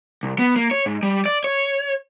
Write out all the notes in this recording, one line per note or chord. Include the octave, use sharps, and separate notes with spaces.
C2
B3
A#3
C#5
G#2
G3
D5
C#5